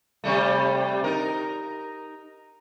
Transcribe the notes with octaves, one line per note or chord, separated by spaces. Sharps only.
C3 G3 A3
D#4 A#4